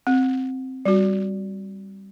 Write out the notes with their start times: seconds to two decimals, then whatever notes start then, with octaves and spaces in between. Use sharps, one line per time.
0.07 C4
0.85 G3 F#4